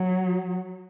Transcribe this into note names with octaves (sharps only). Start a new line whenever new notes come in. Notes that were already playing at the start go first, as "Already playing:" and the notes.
Already playing: F#3